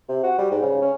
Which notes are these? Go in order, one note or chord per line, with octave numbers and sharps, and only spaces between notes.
C3
F#4
G3
G#2
C#3
C#4